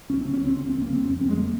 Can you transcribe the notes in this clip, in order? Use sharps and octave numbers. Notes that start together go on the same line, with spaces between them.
C#2 C#4
C4
C#3
C#4
C#2 C4
C#3 C#4
C4
C#2
A#3
C#3 C4
F2 C#4
F2 C4
G#3
C#3 A#3